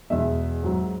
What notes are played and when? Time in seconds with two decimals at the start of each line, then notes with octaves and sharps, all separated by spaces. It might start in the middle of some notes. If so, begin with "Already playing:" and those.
0.10 E2 B2 G#3 E5
0.63 G#2 F#3